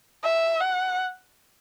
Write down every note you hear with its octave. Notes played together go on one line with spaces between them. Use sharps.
E5
F#5